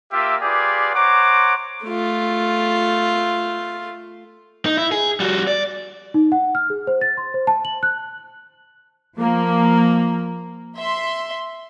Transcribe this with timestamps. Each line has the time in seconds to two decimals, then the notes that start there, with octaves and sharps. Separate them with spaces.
0.12 A#3 F4 G4 E5
0.42 F4 G4 G#4 B4 D5
0.95 C5 C#5 F#5 A#5 D6
1.84 A3 F4
4.66 D#4
4.77 E4
4.92 G#4
5.20 G3 F#4
5.47 D5
6.14 D#4
6.32 F#5
6.55 F6
6.70 G#4
6.87 C5
7.01 A6
7.17 C6
7.34 C5
7.47 A5
7.65 F#7
7.83 F#6
9.18 F3 A#3
10.77 E5 C6